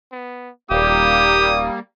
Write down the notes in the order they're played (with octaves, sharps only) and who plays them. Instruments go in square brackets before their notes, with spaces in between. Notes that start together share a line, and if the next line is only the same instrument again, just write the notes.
[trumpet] B3
[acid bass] D#1 [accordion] G3 A#3 [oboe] G4 [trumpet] D#6